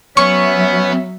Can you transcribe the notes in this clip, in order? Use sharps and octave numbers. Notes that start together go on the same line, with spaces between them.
F#3 B3 C#4 E5 C#6